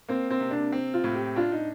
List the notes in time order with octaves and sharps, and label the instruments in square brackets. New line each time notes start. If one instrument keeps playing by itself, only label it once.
[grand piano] A#3 [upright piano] C4
[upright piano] C4
[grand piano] C3
[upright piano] D4
[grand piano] C4
[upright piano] F4
[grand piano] A2
[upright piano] G4
[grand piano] D4 [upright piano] F4
[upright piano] D#4